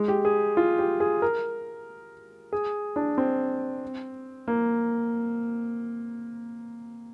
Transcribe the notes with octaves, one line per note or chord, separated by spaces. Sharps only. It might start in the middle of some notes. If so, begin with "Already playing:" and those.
Already playing: G#3
G4
G#4
F4
G4
G#4
A#4
G#4
D4
C4
A#3